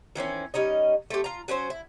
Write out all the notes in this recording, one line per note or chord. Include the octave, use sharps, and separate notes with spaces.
D#3 E3 C4 C#4
G3 C#4 D#4 D#5
A3 C4 G4
F4 A#5
F#3 C#4 D#4 C5
E4